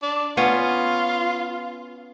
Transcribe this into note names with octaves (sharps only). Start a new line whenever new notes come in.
D4
B3 C#4 F4